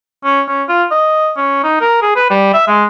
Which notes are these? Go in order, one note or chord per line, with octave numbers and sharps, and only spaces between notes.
C#4
C#4
F4
D#5
C#4
D#4
A#4
G#4
B4
G3
E5
G#3